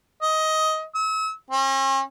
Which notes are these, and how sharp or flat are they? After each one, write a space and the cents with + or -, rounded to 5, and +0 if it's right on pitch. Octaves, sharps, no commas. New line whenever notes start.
D#5 +15
E6 -40
C#4 -45